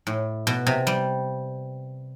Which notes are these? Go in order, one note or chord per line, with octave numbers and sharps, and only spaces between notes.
A2
B2
C3
G3